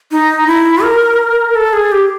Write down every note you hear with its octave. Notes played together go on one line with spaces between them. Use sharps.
D#4
E4
A#4
A4
G#4
G4